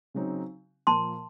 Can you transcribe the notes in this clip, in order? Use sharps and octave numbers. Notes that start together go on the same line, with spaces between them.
C#3 F#3 C4 D#4
A#2 F3 A#3 A5 C6